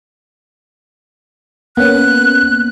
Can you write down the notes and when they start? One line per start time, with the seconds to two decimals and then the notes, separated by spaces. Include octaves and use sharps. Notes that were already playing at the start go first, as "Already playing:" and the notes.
1.77 A#3 B3 C#4 F#6